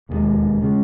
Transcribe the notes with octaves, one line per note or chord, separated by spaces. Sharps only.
E1 D#2 C#3 G#3
C#3 G#3